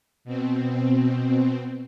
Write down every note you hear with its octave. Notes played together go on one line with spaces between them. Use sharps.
B2 C4